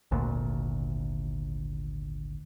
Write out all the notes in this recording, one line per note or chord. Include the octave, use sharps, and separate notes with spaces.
G#1 D2 A#2